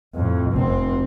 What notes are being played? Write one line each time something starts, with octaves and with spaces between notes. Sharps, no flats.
F2 A2
F1 C4